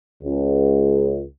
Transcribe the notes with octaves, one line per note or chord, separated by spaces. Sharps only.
C#2